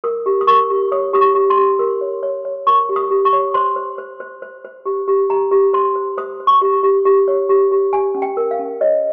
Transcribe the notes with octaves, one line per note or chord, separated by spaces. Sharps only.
A#4 D#6
G4
D#6
A#4 C#6
G4
C#5 D#6
G4 D#6
C#6
G4
C6
G4
A#4
C#5
C#5
C#5
A#4 C#6
G4
D#6
G4
C#6
C#5
C5 C6
C5
C5
C5
C5
C5
G4
G4
G4 A#5
G4
C5 C6
C5
C5 D#6
C5
C#6
G4
G4
G4
C#5
G4
G4
G4 G#5
C#4
G5
A#4
F5
C#4
C#5 D#5